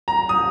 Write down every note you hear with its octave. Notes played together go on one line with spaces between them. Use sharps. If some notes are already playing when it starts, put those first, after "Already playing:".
A#5
D#6